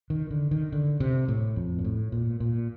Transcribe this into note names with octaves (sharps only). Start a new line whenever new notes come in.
D#3
D3
D#3
D3
C3
A2
F2
A#2
A2
A#2
A#2